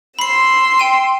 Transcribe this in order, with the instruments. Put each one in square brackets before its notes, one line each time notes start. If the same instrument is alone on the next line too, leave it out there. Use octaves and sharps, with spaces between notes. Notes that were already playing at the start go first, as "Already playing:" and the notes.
[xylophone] B5 C7 [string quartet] C6 E6
[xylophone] G5 D#7